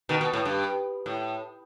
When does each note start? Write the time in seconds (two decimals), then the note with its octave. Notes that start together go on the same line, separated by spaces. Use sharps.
0.09 B2 D#3
0.21 B2
0.33 A2
0.45 G2
1.06 A2